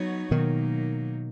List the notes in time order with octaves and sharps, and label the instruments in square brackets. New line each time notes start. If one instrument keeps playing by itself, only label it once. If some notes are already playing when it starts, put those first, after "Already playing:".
Already playing: [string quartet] F#3 B3 D#4 F#4 C#5
[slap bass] B2 D#3 [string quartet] F#3 A#3 D#4